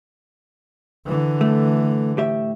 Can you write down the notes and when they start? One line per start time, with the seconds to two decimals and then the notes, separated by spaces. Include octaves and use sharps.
1.06 D3 E3
1.41 A3
2.17 A2 G4 E5